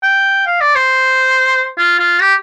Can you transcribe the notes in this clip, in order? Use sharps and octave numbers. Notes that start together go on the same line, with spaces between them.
G5
F5
D5
C5
F4
F4
G4